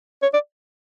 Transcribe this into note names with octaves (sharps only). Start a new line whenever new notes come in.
C#5
D5